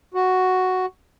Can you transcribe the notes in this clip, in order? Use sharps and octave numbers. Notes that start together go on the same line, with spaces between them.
F#4